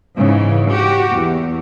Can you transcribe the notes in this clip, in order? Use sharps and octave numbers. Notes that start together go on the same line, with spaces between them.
G#2 C#3 E3
F#4 G4
E2